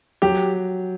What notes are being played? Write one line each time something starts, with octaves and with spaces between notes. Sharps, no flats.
F#3 G4